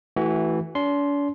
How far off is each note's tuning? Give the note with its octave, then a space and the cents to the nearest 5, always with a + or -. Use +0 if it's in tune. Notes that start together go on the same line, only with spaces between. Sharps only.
E3 -5 A3 +0 F#4 +30
D4 -45 C6 +0